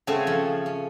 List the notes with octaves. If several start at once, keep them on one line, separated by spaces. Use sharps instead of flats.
C#3 A3 C4 F#4 C#5 G#5
F3 C#4
C#4